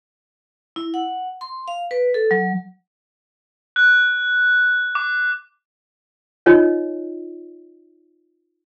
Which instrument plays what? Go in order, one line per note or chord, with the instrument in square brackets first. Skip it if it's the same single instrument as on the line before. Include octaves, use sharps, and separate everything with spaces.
[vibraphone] E4
F#5
C6
F5
B4
A4
F#3
[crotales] F#6
D6
[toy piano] D#4 F4 C#5 D#5